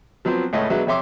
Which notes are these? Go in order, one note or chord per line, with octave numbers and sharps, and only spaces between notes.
F3 F#3 B3 C4
C#2 A2 A3 C#4 D#5
B2 F#3 G#3 B3 D4 E5
F2 C3 C#5 E5 C6 D6